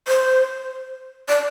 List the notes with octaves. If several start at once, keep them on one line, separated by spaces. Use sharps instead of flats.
C5
D5